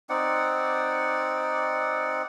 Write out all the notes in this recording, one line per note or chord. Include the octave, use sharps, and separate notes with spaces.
C4 D#4 D5 F#5